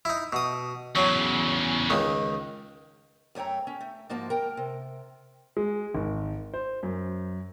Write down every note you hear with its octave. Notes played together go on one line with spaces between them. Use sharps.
D#4 E4
B2 D#6
E2 C#3 F#3
C#2 D#3
F#2 A3 C#5 G5 A#5
C#4
A3
G#2 F3 A#3 F#4 A5
A#4 G5
C3
G#3
G#1
C5
F#2